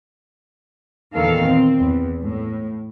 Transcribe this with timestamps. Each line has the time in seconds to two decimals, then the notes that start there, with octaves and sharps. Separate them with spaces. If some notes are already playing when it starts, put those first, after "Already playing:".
1.14 E2 A#2 D#3 A4 F5
1.43 C4
1.76 E2
2.22 A2